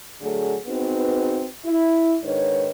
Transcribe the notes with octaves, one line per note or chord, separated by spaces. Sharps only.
D3 F#3 A3 G#4
B3 C4 D#4 F#4 G#4 B4
E4
G#2 D#3 D4 B4 C#5